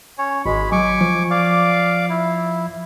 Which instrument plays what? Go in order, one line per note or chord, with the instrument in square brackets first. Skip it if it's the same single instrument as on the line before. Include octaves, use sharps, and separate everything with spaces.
[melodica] C#4 C#5
[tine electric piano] G#1 [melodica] G#3 B5
[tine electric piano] F#3 [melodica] G#5 C#6 D6
[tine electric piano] F3
[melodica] D5 F5 D6
E4